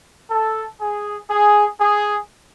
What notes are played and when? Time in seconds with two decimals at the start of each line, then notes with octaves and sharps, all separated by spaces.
0.31 A4
0.81 G#4
1.30 G#4
1.81 G#4